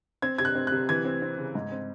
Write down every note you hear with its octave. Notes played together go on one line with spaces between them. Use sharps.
C4 G#6
C3 G#6
F#6
C4
F#6
C3
E3 G#6
C4
C4
C#3
G#2
C4